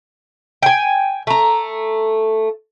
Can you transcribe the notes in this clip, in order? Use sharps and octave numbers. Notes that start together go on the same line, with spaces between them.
G5 G#5
A3 A#5